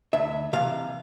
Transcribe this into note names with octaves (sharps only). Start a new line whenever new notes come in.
D2 E5
C3 E3 F5